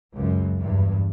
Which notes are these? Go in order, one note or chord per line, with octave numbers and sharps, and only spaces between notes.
C#2 F#2
E2 G2